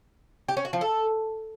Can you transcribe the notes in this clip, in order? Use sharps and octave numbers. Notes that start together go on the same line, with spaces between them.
G4
C#4
F#4
F3
A4